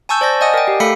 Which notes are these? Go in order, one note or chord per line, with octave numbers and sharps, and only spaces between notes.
G#5 A5 C#6 E6 G6
C5 D5 A5 A#6
D5 D#5 F#5 G#5 D#6
A#4 G5
G4
A3 A4 F5 B5 B6 C#7